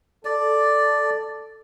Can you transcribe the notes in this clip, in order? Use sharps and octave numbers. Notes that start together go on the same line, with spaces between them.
A4 D5